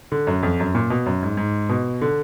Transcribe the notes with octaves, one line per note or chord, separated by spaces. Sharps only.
D3
F#2
F2
F#2
A#2
B2
F#2
G#2
G#2
B2
D3